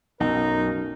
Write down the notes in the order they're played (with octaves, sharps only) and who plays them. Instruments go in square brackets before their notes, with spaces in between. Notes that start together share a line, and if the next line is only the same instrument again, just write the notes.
[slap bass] B1 [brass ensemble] F#2 A#4 [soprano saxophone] D#4